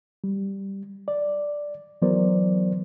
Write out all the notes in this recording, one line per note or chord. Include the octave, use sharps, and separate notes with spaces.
G3
D5
E3 F#3 B3 A#4 C5 D5